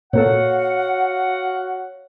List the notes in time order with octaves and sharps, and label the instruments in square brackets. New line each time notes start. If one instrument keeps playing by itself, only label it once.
[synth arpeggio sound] A#2 A#3 A4 [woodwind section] F#4 F5 F#5 [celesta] C#5